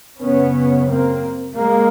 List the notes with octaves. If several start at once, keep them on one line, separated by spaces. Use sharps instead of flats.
F#2 C#3 B3 C#4
A#3 C4
G#3 A#3